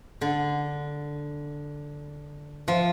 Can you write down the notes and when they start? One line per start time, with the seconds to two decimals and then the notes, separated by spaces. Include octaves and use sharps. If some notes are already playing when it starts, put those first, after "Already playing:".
0.21 D3
2.68 F3